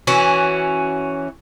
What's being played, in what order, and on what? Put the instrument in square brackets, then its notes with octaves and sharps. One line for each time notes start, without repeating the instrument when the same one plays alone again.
[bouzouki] E3 C#4 F#4